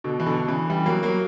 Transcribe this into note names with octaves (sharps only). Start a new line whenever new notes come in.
B2 D3
E3
B2 D3
C#3 E3
E3 G3
F#3 A#3
F#3 A#3